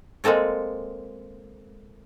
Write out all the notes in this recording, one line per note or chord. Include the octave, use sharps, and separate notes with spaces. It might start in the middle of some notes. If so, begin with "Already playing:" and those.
G#3 A#3 C4 A4 C#5